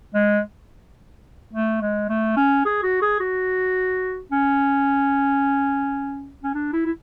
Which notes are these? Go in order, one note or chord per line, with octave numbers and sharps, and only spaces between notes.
G#3
A3
G#3
A3
C#4
G#4
F#4
G#4
F#4
C#4
C#4
D4
E4
E4